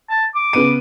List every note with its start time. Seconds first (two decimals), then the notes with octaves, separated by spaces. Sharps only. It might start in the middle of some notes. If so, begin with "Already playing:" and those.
0.09 A5
0.35 D6
0.53 C#3 B3 D#7